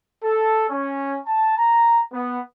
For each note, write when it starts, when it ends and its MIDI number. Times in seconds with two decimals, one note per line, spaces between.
0.23 0.65 69
0.70 1.18 61
1.27 1.56 81
1.57 2.01 82
2.12 2.40 59